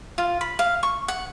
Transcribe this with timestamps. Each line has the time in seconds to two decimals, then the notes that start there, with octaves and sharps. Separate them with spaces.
0.18 F4
0.41 B5
0.59 F5
0.83 C#6
1.08 F#5